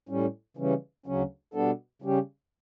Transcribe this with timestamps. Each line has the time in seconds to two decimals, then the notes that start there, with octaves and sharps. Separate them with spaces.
0.09 A2 G3 C#4
0.57 C#3 E3 G3 C#4
1.06 D2 C#3 F#3 C#4
1.54 B2 G3 B3 D4 A4
2.02 C#3 G3 C#4 G4